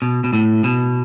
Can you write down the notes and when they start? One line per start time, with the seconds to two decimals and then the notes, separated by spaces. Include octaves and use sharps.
0.02 B2
0.24 B2
0.33 A2
0.64 B2